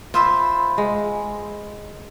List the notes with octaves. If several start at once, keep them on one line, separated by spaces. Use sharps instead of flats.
F4 C5 E5 B5
G#3